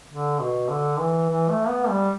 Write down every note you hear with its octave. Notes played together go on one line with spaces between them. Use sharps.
D3
B2
D3
E3
E3
A3
B3
G3